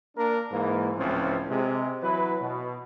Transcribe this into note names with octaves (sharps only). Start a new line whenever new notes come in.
A#3 D4 A#4
G#2 E3 A#3
C#2 A2 E3 F3 C4 C#4
C3 G#3
E3 F#3 E4 B4
B2